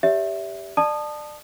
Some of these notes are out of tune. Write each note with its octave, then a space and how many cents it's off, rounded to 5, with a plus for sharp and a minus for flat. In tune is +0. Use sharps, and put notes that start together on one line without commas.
G4 +0 C#5 +45 E5 +0
D5 +30 A5 +0 D#6 -25